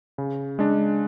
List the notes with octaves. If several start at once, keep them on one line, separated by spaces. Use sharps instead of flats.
C#3
G#3 D4